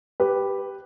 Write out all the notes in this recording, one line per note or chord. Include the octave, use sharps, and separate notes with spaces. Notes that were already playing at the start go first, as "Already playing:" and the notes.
G4 B4